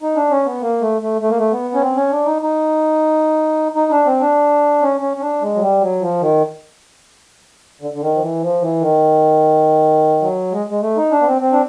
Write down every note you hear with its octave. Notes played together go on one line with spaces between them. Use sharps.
D#4
D4
C#4
B3
A#3
A3
A3
A3
A#3
A3
B3
C#4
C4
C#4
D4
D#4
D#4
D#4
D4
C4
D4
C#4
C#4
C#4
D4
G#3
F#3
G3
F#3
F3
D#3
D3
D3
D#3
F3
E3
F3
E3
D#3
F#3
G#3
G#3
A3
D#4
D4
B3
C4
C4
D4